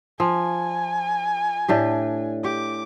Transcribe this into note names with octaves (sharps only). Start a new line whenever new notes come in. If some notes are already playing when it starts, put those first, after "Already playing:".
F3 G#5
A2 D4 G4
G4 D6